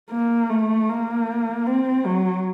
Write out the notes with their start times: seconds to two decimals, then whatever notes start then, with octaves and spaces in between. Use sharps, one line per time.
0.11 A#3
0.49 A3
0.89 A#3
1.66 C4
2.06 F#3